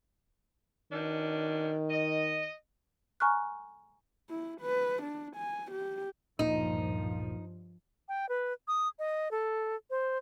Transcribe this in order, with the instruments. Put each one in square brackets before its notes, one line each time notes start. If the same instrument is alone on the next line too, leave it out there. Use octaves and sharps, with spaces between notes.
[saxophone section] B2 C#4 D4 [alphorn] D#3
[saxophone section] D#5
[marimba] G#5 A#5 C#6 F6 F#6
[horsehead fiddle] E4
B4
D4
G#5
G4
[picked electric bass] D1 A#2 A#3 [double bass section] G2 F3 [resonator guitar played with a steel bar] D#4
[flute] G5
B4
D#6
D#5
A4
C5